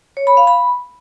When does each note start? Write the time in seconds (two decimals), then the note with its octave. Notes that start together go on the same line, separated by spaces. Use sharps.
0.17 C#5
0.27 B5
0.37 F5
0.47 B5